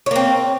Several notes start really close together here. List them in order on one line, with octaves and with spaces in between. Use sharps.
C#5 A#3 C4